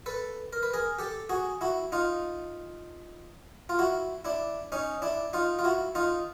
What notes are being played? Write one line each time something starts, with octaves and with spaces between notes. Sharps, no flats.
A4 B4
A#4
B4
G#4 A#4
G4 A4
F#4 G#4
E4 F#4
D#4 F4
F4
E4 F#4
D4 E4
C#4 D#4
D4 E4
D#4 F4
F4
E4 F#4
D#4 F4